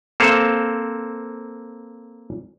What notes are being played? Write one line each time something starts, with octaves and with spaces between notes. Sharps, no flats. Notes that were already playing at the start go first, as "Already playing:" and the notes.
A#3 C4 A4 B4 C5 F5